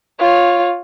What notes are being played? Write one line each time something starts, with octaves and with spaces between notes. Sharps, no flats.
F4 C#5